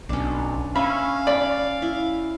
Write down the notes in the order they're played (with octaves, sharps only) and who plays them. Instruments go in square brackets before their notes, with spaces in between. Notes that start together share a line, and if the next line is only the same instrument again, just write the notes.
[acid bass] B1 [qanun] C#4 D4
[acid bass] C#4 [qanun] E5 [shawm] F5 [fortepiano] B5
[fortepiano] D5 [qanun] B5
[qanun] E4